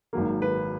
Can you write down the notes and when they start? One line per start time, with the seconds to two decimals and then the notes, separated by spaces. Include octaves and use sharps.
0.13 G#1 G#2 F#3 A#3
0.42 B4